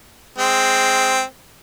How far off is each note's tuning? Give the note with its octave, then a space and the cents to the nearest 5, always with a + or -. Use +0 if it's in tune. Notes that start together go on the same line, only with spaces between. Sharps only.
G#3 +0 C4 +0